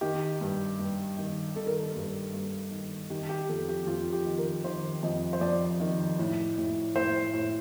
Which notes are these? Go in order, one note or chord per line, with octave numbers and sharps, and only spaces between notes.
D#3 G4
G2
G2
D#3
D#3 A4
A#4
A4
G2
G2
D#3
D#3 G4
G4
F2 A4
G4
F2 F4
G4
D#3
A#4
D#3 C5
F2 D#5
C5
F2 D5
D#3
A2
A2
A2 C5
A2